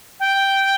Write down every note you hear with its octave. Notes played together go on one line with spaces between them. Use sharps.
G5